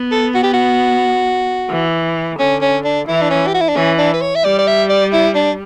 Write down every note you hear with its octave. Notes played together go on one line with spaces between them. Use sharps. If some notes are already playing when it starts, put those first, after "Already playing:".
Already playing: B3
A4
F#4
G4
F#4
E3
D3 C#4
C#4
D4
E3 E4
D4
C#4
G4
F#4
E4
D4
E3 C#4
D4
B4
C#5
E5
G3 D5
D5
E5
D5
E4
D4